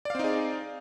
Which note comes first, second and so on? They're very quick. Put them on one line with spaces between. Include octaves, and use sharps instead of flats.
D5 F5 C4 D#4 G#4